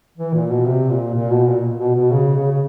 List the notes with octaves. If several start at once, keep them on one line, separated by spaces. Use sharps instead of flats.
E3
A#2
B2
C3
A#2
A#2
B2
A#2
B2
B2
C#3
C#3
C#3